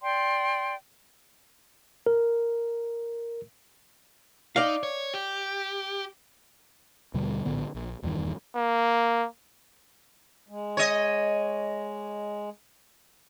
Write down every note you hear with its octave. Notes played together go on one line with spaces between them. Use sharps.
D5 G5 C6
A#4
D#4 D5 F5
C#5
G4
D#2 B2 D3 G3
A#1 A2 D3 B3
A#1
D#1 E2 G2 D#3
A#3
G#3
C#5 D#5